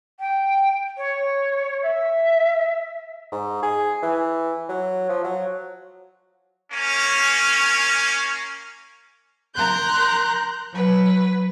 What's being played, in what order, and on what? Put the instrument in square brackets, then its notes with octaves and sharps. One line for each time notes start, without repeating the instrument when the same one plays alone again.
[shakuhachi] G5
C#5
E5
[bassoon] G#2
G#4
E3
F#3
F3
F#3
[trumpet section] A#3 C#4
[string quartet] A#4 A#5 C6 F#6 G6
F#3 B4